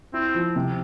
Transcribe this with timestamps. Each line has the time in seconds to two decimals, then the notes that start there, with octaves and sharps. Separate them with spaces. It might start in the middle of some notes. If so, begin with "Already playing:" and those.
0.13 C4 E4
0.34 F3
0.56 C3